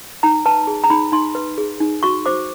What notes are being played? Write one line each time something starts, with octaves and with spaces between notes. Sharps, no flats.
D#4 A#5
B4 A5
G#4
A#5
D#4 B5
D#4 C6
B4
G#4
D#4
F#4 C#6
C5 D6